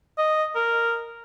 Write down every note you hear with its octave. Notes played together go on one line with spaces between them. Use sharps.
D#5
A#4